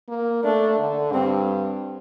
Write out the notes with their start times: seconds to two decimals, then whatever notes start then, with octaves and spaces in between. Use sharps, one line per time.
0.09 A#3
0.44 A3 D4
0.79 D3
1.13 G2 C4